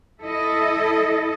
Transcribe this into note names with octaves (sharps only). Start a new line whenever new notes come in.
E4 A4 D#5